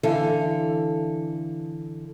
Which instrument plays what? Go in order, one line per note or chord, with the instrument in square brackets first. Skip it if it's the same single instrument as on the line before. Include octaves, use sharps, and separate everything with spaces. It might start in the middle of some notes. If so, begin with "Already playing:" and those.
[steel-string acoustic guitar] D3 E3 A4 F5